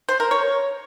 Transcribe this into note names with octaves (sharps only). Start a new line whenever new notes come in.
C5
A#4
C#5